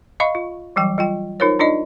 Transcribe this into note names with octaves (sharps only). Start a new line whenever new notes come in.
D#5 F5 B5 C#6
F4
E3 F#3 G3 G5
G3 F4 G5
D#4 F4 A#4 C5 C#5
D4 D#4 F4 D5 D#5